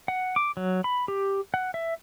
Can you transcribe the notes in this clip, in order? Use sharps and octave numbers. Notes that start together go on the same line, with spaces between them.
F#5
D6
F#3
B5
G4
F#5
E5